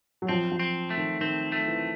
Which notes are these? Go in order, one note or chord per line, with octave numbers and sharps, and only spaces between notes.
F#3
F3 C4
F3
C4
A3
D#3
D#3 C4
A3
E3